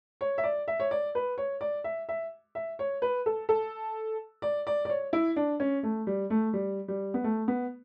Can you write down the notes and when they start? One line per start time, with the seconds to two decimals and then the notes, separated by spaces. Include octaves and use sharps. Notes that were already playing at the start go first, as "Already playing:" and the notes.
0.21 C#5
0.38 E5
0.44 D5
0.68 E5
0.80 C#5
0.91 D5
1.15 B4
1.38 C#5
1.61 D5
1.84 E5
2.09 E5
2.55 E5
2.79 C#5
3.02 B4
3.26 A4
3.49 A4
4.42 D5
4.67 D5
4.85 D5
4.89 C#5
5.13 E4
5.36 D4
5.60 C#4
5.83 A3
6.07 G3
6.30 A3
6.53 G3
6.88 G3
7.14 B3
7.24 A3
7.48 B3